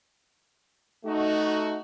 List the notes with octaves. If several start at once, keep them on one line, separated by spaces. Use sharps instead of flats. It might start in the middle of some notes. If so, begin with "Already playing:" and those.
A3 D#4 F#4